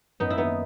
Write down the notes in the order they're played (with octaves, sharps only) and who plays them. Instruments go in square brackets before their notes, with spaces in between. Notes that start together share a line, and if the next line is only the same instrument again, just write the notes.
[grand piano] F#2 [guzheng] B3 D#4
[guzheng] E4
[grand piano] D#3 A#3 [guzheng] B3 D#4